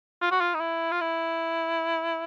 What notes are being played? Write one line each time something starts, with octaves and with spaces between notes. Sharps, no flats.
F4
F#4
F4
D#4
E4
F4
E4